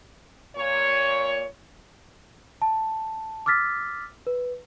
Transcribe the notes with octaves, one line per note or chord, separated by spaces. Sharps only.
A#2 C#5
A5
D6 E6 F6 A6 B6
B4